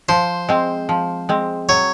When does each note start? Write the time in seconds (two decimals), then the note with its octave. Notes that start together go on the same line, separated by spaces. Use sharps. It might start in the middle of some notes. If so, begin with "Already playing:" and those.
0.09 F3 C5
0.49 G#3 C4
0.89 F3
1.29 G#3 C4
1.69 F#3 C#5